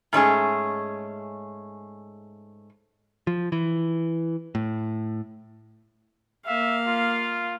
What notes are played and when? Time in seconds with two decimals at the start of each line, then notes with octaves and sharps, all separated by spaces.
0.13 G#2 A3 C#4 G#4
3.27 F3
3.52 E3
4.55 A2
6.47 A#3 E5 F5
6.87 F4